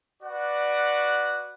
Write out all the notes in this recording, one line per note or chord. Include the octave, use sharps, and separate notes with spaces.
F#4 B4 D5 F#5